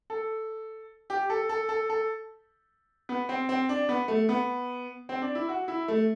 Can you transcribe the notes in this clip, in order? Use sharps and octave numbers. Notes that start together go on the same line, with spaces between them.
A4
G4
A4
A4
A4
A4
B3
C4
C4
D4
B3
A3
B3
C4
D4
E4
F#4
E4
A3